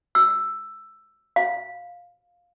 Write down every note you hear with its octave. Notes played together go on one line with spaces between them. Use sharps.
E6
F5